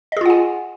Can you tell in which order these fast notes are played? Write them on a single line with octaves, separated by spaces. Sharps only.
D#5 G#4 F4 F#5 G#5